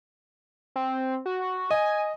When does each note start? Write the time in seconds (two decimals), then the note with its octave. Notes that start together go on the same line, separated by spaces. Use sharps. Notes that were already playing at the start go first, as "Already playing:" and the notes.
0.76 C4
1.26 F#4
1.71 D#5 G#5